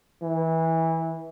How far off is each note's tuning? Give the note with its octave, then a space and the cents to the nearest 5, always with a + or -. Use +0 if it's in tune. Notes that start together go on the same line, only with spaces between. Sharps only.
E3 -20